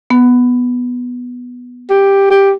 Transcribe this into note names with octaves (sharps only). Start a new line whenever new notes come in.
B3
G4
G4